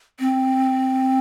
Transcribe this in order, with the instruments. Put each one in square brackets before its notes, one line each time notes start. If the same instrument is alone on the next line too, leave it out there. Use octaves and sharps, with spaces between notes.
[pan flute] C4